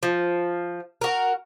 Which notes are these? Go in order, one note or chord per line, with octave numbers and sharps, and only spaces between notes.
F3
F#4 A#4